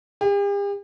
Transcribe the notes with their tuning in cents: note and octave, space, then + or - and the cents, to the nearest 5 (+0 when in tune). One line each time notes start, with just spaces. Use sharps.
G4 +45